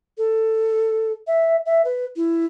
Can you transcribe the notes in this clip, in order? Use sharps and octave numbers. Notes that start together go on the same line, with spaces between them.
A4
E5
E5
B4
E4